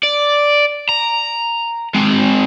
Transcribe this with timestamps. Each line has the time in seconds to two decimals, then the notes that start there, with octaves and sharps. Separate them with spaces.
0.03 D5
0.89 A#5
1.95 G#3 C4